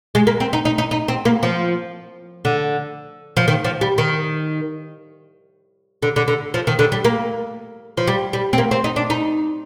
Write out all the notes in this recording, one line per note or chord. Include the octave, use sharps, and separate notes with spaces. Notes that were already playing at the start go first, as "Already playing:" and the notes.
G#3
A#3
C4
D#4
D#4
D#4
D#4
C4
A#3
F3
D3
F3
D#3
F3
G3
D#3
D3
D3
D3
F3
D#3
D3
G3
A#3
F3
G3
G3
C4
A#3
C4
D#4
D4
D#4